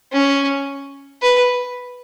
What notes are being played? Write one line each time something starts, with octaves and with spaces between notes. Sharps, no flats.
C#4
B4